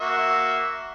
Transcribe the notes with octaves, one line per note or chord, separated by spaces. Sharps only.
A#3 F#4 E5